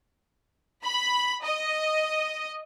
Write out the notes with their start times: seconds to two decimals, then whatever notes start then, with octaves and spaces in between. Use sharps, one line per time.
0.84 B5
1.44 D#5